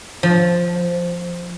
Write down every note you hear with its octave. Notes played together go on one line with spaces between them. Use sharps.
F3